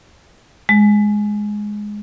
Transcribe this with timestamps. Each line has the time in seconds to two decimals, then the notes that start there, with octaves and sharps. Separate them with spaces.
0.69 G#3